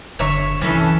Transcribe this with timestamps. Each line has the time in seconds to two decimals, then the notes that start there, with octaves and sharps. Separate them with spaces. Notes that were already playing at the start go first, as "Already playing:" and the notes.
0.19 F#1 D3 C#5 E5 C#6
0.62 C2 F#2 E3 C#4 A4